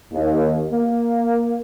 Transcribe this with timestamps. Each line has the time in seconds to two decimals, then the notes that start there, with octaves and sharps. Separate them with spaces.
0.11 D#2
0.69 A#3